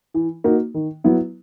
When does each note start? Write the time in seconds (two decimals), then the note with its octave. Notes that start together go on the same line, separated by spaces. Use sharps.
0.14 E3
0.44 A#3 D#4 F#4
0.74 D#3
1.04 F#3 B3 E4